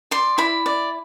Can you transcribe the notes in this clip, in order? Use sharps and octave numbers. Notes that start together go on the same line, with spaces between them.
D5 C6
E4 B5
D5